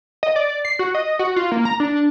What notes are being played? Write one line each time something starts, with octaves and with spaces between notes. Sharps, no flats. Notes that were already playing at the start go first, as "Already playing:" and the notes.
D#5
D5
C7
F#4
D#5
F#4
F4
A#3
A#5
D4